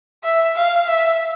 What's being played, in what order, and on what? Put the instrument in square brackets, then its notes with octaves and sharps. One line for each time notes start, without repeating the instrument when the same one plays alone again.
[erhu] E5
F5
E5